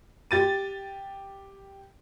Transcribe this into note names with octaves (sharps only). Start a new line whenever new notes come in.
G4 A6 D#7